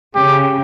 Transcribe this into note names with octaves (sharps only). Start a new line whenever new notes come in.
C#3 G4